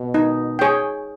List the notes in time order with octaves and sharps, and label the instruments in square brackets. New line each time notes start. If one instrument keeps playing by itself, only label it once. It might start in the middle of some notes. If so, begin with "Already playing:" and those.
Already playing: [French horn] B2
[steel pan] D#4
G#4 C#5 G5